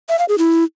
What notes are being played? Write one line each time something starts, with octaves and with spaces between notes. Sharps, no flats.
E5
F5
G#4
E4